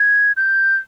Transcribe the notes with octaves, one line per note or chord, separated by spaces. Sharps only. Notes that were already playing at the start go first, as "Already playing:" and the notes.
Already playing: G#6
G6